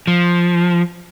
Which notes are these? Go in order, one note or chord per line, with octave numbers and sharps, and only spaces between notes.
F3